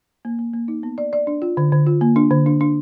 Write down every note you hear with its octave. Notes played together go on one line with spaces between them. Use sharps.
A#3
A#3
A#3
D#4
B3
D5
D5
D4
F4
D3
D3
F4
A#3
D4
D3
D4
D4